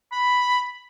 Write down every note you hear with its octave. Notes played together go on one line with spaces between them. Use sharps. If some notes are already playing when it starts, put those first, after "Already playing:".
B5